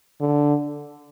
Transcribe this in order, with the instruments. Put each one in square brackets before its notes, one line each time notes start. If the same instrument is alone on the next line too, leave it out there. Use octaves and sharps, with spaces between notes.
[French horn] D3